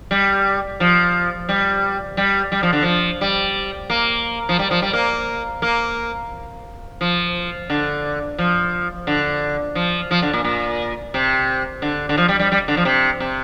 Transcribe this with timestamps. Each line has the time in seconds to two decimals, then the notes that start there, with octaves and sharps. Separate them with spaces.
0.11 G3
0.80 F3
1.49 G3
2.17 G3
2.52 G3
2.63 F3
2.73 D3
2.83 F3
3.21 G3
3.90 A#3
4.49 F3
4.59 G3
4.71 F3
4.82 G3
4.93 A#3
5.62 A#3
7.01 F3
7.70 D3
8.38 F3
9.07 D3
9.75 F3
10.11 F3
10.22 D3
10.33 A#2
10.44 A#2
11.14 C3
11.82 D3
12.09 D3
12.17 F3
12.28 G3
12.39 G3
12.52 G3
12.68 D3
12.77 F3
12.85 C3
13.20 C3